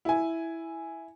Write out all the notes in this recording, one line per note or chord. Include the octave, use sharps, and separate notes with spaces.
E4 G#5